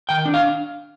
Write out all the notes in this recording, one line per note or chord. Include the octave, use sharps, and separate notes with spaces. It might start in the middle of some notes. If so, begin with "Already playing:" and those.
D#3 G5
D4
F5